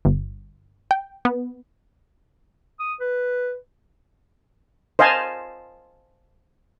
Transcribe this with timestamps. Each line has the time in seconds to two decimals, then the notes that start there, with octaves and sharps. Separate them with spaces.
0.05 G1
0.91 G5
1.25 B3
2.80 D#6
3.00 B4
4.99 C5 D#5 F5 G#5 A5